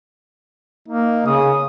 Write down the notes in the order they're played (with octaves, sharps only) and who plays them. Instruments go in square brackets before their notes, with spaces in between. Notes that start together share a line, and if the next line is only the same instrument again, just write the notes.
[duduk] A#3 [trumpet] D#4
[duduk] C#3 [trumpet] D#6